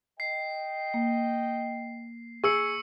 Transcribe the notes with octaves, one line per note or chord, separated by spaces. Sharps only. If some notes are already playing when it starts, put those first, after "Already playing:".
D#5 G5 C7
A#3
G#4 C#6 E6 C#7